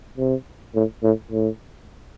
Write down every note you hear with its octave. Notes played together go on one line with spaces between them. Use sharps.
C3
A2
A2
A2